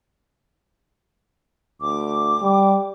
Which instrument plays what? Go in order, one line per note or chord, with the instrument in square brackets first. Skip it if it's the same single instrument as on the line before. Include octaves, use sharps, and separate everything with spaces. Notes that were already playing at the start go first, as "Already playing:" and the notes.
[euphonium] D2 [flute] D6
[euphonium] G3